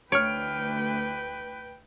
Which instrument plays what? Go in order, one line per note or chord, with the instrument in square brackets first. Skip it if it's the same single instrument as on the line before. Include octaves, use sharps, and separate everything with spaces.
[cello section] D2 [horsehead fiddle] B4 G5 [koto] C#5 [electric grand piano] F6 D7